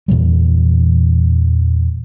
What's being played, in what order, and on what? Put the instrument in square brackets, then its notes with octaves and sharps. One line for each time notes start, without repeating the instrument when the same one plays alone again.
[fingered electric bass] E2 A#2 E3 G3